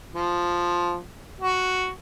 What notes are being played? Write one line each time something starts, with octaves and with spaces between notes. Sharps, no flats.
F3
F#4